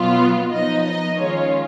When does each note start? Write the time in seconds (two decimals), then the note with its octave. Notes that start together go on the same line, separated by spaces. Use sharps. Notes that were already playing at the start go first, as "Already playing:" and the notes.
Already playing: B2 F#3 B3 F4
0.52 F3 B3 D#4 D#5
0.85 D#5
1.18 D#3 G#3 C#4 F4 C#5